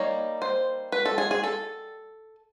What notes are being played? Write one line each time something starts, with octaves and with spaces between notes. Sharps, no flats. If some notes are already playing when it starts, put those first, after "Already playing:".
Already playing: G3 A#3 D#4 C#5
C5
B4
A4
G#4
G#4
A4